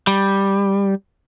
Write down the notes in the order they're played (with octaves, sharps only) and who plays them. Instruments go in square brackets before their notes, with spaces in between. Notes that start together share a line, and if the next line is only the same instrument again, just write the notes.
[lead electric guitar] G3